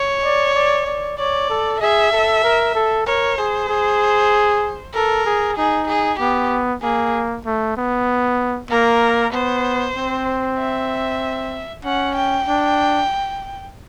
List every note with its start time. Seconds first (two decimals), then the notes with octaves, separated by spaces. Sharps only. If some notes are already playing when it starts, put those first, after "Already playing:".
Already playing: C#5
0.24 D5
0.55 D5
0.86 D5
1.18 C#5 D5
1.49 A4
1.81 G#4 E5
2.12 A4
2.44 A#4
2.75 A4
3.06 A#4 C#5
3.38 G#4 C5
3.69 G#4
4.94 A4 A#4
5.26 G#4
5.57 D#4 G#4
5.88 G#4
6.20 B3 G4
6.83 A#3 G#4
7.46 A3
7.77 B3
8.71 A#3 A#4
9.33 B3 C5
9.97 C4
10.59 E5
11.84 C#4 F#5
12.16 G5
12.47 D4